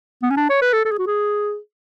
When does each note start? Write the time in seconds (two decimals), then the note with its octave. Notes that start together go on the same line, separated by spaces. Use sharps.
0.22 B3
0.30 C#4
0.37 D4
0.50 C#5
0.62 B4
0.73 A4
0.85 A4
0.91 G#4
0.99 F#4
1.07 G#4